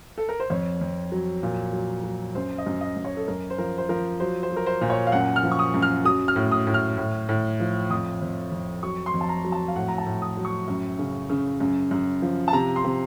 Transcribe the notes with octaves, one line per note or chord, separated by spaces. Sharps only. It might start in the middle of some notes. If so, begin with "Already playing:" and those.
A4
A#4
C5
F2 C#5
F2
F#3
A#2
F#3
F#3
F#2 C5
D#5
F#2
D#5
F#2
C#5
A4
F#2 A#4
C5
F3 A#4
C5
F3 A#4
F#3 C5
C5
F#3
A#4
C5
A#2
C#5
F5
F#2 F#5
F6
F3
C#6
D#6
F#2
F6
F#3 D#6
F6
A2
D#6
A2
F6
A2
A2
F3
F2 D#6
F2
F2
F#3 C#6
C6
F2
A5
A#5
F#3
A5
F5
A2 F#5
A#5
A5
A2
D#6
F#3
C#6
F#2
C#3
C#3
F#2
F#2
F3
A5
C3 A#5
C6
C3